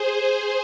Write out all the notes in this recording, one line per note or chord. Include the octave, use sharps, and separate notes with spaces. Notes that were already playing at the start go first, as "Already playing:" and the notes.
Already playing: G#4 C5